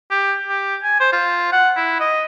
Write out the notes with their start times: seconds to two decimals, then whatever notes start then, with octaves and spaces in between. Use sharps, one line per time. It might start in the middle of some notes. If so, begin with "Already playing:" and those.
0.11 G4
0.48 G4
0.83 G#5
1.00 C5
1.13 F4
1.53 F#5
1.77 E4
2.00 D#5